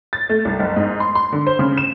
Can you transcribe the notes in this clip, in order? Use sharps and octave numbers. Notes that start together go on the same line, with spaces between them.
A6
A3
C2
F#1
G#2
C6
C6
D3
C5
C#3
E7